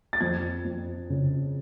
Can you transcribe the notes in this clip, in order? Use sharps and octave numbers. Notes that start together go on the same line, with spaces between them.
A6
F2 G#6
F2
C#3